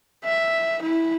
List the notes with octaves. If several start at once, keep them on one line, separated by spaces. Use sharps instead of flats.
E5
E4